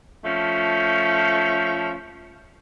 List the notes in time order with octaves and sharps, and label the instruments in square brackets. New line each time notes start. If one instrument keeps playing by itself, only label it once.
[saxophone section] F3 A3 C#4